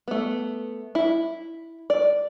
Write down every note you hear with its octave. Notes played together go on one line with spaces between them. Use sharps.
A3 B3
E4
D5